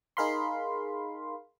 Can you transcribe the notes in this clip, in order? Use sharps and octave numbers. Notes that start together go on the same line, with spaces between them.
D#4 G#4 A#4 F5 B5 C6